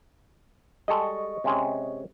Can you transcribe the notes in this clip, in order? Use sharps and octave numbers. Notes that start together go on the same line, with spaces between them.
G3 G#3 A4 D#5 C#6
C3 G#3 C#4